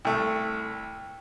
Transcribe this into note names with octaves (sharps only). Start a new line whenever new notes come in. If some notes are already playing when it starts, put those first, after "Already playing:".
C2 A3